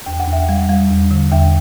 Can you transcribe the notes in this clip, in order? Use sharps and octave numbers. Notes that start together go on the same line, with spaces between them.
E2 G5
F#5
E2 E5 G5
G3
G3
E2
D3
E2 E5 G5